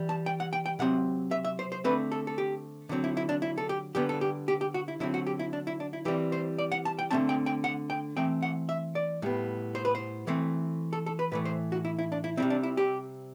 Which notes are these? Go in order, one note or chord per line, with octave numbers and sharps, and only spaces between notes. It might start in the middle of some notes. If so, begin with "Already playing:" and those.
Already playing: E3 G3
A5
G5
F#5
G5
G5
C3 F#3 C4 F#5
E5
E5
C5
C5
D3 A3 C4 B4
A4
A4
G4
D3 F#3 C4
E4
E4
D4
E4
A4
G4
D3 G3 B3 G4
A4
G4
G4
G4
F#4
E4
D3 F#3 C4 E4
F#4
G4
E4
D4
E4
D4
E4
E3 G3 C4 G4
C5
D5
F#5
A5
G5
D3 A3 C4 A5
G5
G5
F#5
G5
E3 A3 C4 G5
F#5
E5
D5
A2 G3 B3
C5
B4
C5
E3 A3 C4
A4
A4
B4
A2 E3 A3 B4
C5
F#4
E4
E4
D4
E4
C3 G3 C4 E4
D4
E4
G4